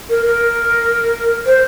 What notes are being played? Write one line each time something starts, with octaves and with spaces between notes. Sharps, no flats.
A#4
A#4
C5